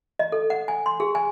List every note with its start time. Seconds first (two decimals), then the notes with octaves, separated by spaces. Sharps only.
0.19 D#5
0.32 A4
0.50 F#5
0.68 G#5
0.86 C6
1.00 G#4
1.15 G#5